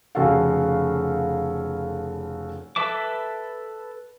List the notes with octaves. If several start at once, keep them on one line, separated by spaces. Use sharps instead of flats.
F1 C#3 F#4 A4 F5
A4 B4 E5 A5 D6